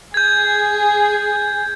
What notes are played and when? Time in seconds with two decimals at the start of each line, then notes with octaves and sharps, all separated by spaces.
0.14 G#4 G6 G#6